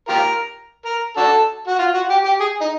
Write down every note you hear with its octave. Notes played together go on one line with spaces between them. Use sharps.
F4 G4 A#4
A#4
D4 F#4 A4
F#4
F4
F#4
G4
G4
G#4
D#4